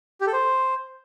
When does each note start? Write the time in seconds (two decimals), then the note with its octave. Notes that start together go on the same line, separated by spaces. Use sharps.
0.21 G4
0.27 A4
0.33 C5